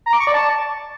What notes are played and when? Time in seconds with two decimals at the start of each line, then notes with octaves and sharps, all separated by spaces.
0.06 A#5
0.13 D6
0.20 C#6
0.27 D5
0.34 A5